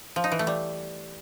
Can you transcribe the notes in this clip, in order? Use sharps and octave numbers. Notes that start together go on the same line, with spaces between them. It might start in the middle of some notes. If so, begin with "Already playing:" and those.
F3
D#4
E3
A3
G3